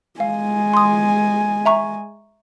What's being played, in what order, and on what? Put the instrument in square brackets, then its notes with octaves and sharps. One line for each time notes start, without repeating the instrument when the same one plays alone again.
[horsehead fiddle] G#3 G#5 [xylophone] F5
[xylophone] C6 D#6
E5 A#5 C#6